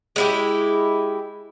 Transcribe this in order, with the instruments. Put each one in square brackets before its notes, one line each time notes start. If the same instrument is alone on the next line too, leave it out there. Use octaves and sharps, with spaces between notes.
[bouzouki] G#3 E4 G4